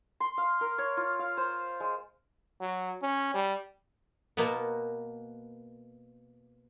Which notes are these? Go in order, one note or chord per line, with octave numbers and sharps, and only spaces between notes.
C6
F5
A#4
C#5
F4
F5
C5
G#3
F#3
C#4
G3
B2 A#3 B3